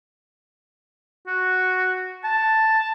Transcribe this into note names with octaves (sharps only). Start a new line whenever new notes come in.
F#4
A5